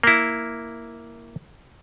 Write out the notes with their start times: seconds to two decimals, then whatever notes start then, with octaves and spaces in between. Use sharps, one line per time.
0.03 A#3 E4